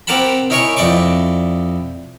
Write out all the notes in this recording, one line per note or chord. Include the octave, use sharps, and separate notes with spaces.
C4 G4 A#4 F#5 A5 B5
D#4 E4 A#4 C#5 G#5 C#6
F2 E4 D5 D#5 C#6 D6